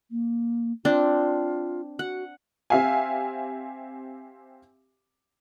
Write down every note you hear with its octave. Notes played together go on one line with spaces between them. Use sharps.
A#3
C4 D4 F4
F#4 F#5
C4 G4 E5 F5 G#5